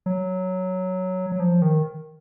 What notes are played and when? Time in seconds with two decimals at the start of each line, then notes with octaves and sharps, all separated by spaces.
0.06 F#3
1.32 F#3
1.40 F3
1.62 D#3